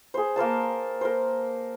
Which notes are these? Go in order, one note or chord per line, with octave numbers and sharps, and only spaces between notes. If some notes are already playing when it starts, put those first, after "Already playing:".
G#4 C5
A#3 A#4 C5 A5
A#4 C5